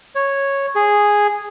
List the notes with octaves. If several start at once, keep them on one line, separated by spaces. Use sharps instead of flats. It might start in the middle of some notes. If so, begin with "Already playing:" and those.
C#5
G#4